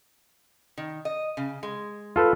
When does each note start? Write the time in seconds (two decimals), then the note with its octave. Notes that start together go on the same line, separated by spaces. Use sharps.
0.78 D#3
1.05 D#5
1.37 C#3
1.63 G#3
2.16 F4 A4 B4